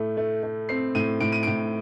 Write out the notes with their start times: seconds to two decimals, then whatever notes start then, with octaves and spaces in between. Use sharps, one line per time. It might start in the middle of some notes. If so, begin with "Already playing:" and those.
Already playing: A2 A3
0.17 A3
0.43 A3
0.69 C4 C7
0.95 A2 D#7
1.21 A2 D7
1.32 D#7
1.43 D7
1.47 A2